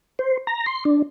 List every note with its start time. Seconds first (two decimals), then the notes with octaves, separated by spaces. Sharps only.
0.19 C5
0.47 A#5
0.66 C6
0.85 D4